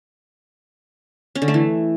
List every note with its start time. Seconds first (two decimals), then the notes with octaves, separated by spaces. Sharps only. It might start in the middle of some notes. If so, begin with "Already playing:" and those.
1.35 C#4
1.42 D3
1.48 A3
1.54 E3